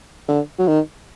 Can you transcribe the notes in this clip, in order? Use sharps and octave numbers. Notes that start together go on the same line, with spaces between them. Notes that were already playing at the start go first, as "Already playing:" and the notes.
D3
F#3
D#3